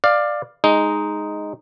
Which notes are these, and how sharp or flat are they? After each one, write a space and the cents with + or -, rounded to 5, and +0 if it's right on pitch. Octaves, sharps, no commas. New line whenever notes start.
D5 +15 F5 +5
G#3 +0 D#4 +0